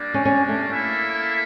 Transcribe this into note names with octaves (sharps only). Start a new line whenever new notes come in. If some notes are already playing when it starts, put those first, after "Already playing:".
Already playing: G3 A#3 D4
C#4
C#4
A3
A#3 E4 A4 E5